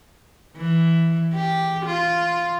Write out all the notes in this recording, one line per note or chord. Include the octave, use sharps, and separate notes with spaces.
E3
G4
F4